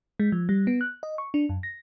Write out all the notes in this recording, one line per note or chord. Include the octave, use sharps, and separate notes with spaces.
G#3
F3
G3
B3
F#6
D#5
C#6
D4
F#2
A#6